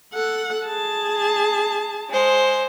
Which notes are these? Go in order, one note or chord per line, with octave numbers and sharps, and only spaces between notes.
A4 F#5
G#4 A5
G#3 C5